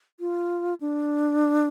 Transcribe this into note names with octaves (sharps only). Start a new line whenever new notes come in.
F4
D4